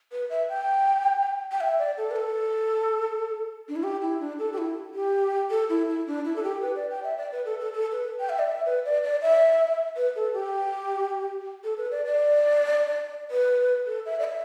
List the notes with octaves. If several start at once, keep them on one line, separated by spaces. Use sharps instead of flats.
B4
E5
G5
G5
E5
D5
A4
B4
A4
D4
E4
G4
E4
D4
A4
G4
E4
G4
A4
E4
E4
D4
E4
A4
G4
B4
D5
G5
E5
D5
B4
A4
A4
A4
B4
G5
E5
D5
E5
B4
D5
D5
E5
B4
A4
G4
A4
B4
D5
D5
B4
A4
E5
D5
E5